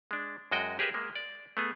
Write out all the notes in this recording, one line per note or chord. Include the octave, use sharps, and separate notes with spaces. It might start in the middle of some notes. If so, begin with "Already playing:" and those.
G#3 D4
F#2 G#3 F#4 D#5 G5
G4 G#4 A#4 B4 E5
G#3 A#3
D5
A3 B3 G#4